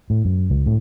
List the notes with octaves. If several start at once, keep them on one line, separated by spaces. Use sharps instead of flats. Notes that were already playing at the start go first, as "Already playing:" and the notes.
A2
F#2
C#2
A2